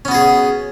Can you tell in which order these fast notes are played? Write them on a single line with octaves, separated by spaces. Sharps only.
C#4 B3 F#4 G#4